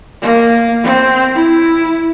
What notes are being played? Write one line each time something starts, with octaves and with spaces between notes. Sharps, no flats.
A#3
C4
E4